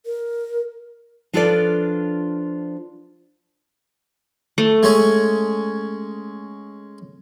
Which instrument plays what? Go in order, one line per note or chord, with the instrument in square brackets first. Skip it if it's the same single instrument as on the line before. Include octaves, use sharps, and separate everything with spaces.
[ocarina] A#4
[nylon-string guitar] F3 D4 F4 A4 B4 D5
[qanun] A3
[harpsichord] G#3 C#4 G#4